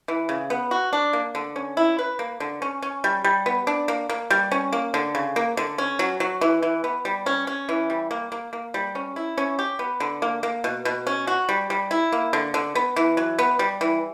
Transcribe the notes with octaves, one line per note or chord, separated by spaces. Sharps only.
E3
C#3
B3
F#4
D4
A#3
D3
C#4
E4
B4
A#3
D3
C#4
C#4
G3
G3
B3
D4
A#3
A#3
G3
C#4
A#3
D3
C#3
A#3
D3
C#4
F#3
F#3
E3
E3
B3
G3
C#4
C#4
E3
G3
A#3
A#3
A#3
G3
C#4
E4
C#4
G4
B3
D3
A#3
A#3
B2
B2
C#4
F#4
G3
G3
E4
A#3
D3
D3
B3
E3
F#3
B3
G3
E3